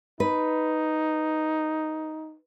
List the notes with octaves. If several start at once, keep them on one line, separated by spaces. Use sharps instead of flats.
D#4 B4